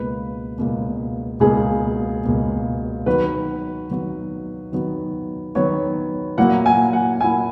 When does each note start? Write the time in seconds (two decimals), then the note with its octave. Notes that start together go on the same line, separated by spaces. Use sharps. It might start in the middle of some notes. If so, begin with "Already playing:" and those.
Already playing: C#2 B2 A#3 B4
0.58 C#2 B2 A#3
1.40 C#2 B2 A#3 G#4
2.24 C#2 B2 A#3
3.06 D#3 F#3 B3 F#4 B4
3.90 D#3 F#3 B3 F#4
4.72 D#3 F#3 B3 F#4
5.55 D#3 F#3 B3 F#4 C#5
6.38 A#2 F#3 A#3 E4 F#5
6.66 G#5
6.93 F#5
7.21 A#2 F#3 A#3 E4 G#5